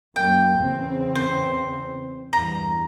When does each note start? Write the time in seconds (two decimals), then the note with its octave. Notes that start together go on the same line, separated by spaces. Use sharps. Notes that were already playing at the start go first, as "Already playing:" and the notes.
0.16 F#2 A#3 G5
0.59 E2 C#3 C4
1.15 C5
2.33 E2 G2 A#5